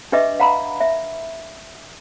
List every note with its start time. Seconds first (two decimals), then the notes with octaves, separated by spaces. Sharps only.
0.12 D4 G4 B4 D#5 E5 D6
0.40 F5 F#5 A#5 B5
0.80 E5